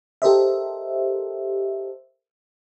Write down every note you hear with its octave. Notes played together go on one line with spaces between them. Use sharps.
G4 A4 A#4 C5 D#5 E5